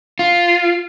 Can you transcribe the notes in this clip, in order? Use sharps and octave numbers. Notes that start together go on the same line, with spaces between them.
F4